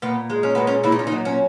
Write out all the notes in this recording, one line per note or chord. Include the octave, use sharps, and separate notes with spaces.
A#2 B3
G#3
C#4
A#2 B3
C#4
A#2 E4
D#4
C#4
D#4
F#3
C#4